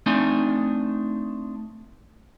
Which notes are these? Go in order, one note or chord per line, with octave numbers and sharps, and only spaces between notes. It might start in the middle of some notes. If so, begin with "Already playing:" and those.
A3 C4 D4 D#4 G#5